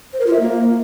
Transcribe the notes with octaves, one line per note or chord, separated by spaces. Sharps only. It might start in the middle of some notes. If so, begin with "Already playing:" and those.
C5
A#4
F4
E5
A#3